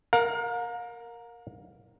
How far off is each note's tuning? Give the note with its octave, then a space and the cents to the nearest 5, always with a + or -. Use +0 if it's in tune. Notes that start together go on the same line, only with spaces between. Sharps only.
A#4 +0 F5 +40